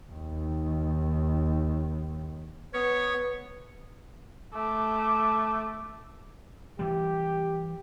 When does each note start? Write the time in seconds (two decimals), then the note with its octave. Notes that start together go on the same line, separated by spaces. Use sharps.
0.11 D#2 D#3
2.74 B3 B4 C#5
4.54 A3 D6
6.79 E3 G3 G4